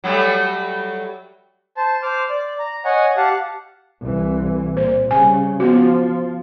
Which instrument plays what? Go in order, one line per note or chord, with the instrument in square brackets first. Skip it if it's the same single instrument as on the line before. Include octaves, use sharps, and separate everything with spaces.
[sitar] F#3 G3 A3
[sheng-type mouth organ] C5 A5
C5 D6 F6
D5
A#5
C#5 D#5 F#5 G#5
G4 F5 F#5 A5
[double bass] C2 E3
[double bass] A#2 [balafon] C5
[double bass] C#3 G3 [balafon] G#5
[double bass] F3 [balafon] B3 F#4